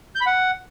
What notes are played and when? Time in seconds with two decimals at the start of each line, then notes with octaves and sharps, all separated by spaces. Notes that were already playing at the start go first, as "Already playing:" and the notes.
0.15 G6
0.21 B5
0.26 F#5